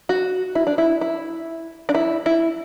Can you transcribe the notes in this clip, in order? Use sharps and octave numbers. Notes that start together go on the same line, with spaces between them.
F#4
E4
D4
E4
E4
D4
E4
E4